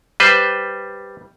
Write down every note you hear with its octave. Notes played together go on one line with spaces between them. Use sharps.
G3 B4 C5